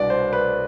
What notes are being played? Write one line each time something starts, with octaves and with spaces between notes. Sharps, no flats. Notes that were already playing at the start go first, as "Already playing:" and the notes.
Already playing: C2 B2 B3 D4 D5
C5
B4